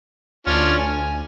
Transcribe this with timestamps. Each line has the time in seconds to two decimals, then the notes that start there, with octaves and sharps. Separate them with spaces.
0.47 D2 C#4 D4 F4
0.78 G#5